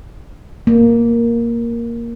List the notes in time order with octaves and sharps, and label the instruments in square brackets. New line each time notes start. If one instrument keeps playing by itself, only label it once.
[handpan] A#3